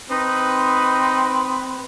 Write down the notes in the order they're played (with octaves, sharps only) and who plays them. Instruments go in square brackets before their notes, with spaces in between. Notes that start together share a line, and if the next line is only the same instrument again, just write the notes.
[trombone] C4 [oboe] D#4 [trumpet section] B4